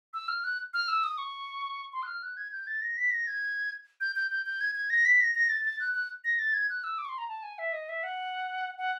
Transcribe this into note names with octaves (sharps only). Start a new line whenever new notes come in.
E6
F6
F#6
F6
E6
D#6
C#6
C6
F#6
F6
F#6
G#6
G6
A6
A#6
B6
A#6
G#6
G6
G6
G6
G6
G#6
G#6
A#6
B6
A#6
A#6
A6
A6
F#6
F#6
A#6
A6
G#6
F#6
E6
D6
C#6
C6
A#5
A5
G#5
E5
D#5
E5
F#5
F#5